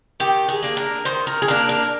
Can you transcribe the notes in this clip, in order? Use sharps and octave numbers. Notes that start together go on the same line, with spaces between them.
D#3 G4
G#4
A#3 D4
A#4
D#3 C5
A#4
G#4
A#3 D4 A#4
A#4